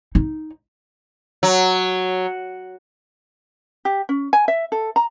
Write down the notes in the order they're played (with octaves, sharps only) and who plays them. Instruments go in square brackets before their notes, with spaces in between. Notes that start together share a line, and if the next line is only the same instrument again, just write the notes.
[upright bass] D#4
[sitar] F#3
[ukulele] G4
C#4
G#5
E5
A4
A#5